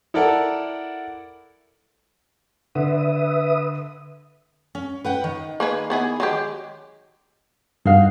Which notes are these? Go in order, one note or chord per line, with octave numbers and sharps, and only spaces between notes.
E4 A4 A#4 D5 F#5
D3 B4 E5 D#6
C#4
B4 F#5 G5
D#3
A#3 G#4 B4
B3 E4 G#4
F#3 G#3 G4
G2 D#4 F#4 F5